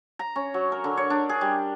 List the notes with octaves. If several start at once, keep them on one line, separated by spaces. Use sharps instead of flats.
A#5
C#4
F#3
A#4
D3
C#5
D4
G#4
G3